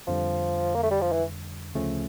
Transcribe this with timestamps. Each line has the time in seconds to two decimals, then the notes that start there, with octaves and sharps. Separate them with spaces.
0.07 F2 D3 F3 G3
0.75 A#3
0.83 A3
0.91 G3
1.01 F3
1.13 E3
1.75 D2 C#3 F3 A3 C#4